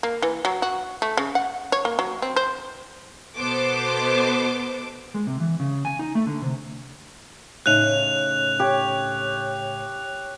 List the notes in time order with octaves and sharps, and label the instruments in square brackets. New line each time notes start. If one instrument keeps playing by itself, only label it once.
[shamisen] A#3
E3
F#3
F#4
A3
C#3
F#5
C#5
A#3
F#3
C4
C5
[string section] B2 B3 A4 C5 D6
[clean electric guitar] G#3
C3
E3
C#3
G#5
D#4
A3
D3
C3
[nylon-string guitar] A2 C#3 D#4 [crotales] F#6 F7
[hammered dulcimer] G4 C#5